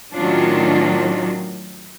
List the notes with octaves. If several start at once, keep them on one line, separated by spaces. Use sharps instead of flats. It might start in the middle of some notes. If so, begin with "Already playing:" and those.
A2 D#3 F#3 C#4 D4 F4